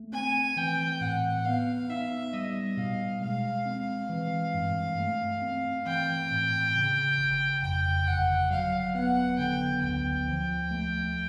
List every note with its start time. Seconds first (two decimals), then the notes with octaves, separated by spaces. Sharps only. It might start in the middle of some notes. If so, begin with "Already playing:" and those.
Already playing: A3
0.13 C4 G#5
0.57 E3 G5
1.01 A2 F#5
1.45 B3 F5
1.89 D#4 E5
2.33 G3 D#5
2.77 B2 F5
3.22 G#3 F5
3.66 C4
4.09 E3
4.54 G2
4.98 A3
5.42 C4
5.86 E3 G5
6.31 A2
6.75 C#3
7.18 G1
7.63 F2 G5
8.07 G1 F#5
8.50 F#3 F5
8.95 B3 F#5
9.39 D3 G5
9.83 D2 G5
10.27 F3
10.71 A3